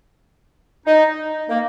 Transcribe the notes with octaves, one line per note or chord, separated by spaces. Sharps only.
D#4
A#3